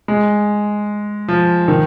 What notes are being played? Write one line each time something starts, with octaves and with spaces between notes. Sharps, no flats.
G#3
F3
D#3